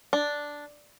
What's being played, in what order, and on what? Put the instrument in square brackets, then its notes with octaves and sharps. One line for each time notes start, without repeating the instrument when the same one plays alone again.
[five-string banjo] D4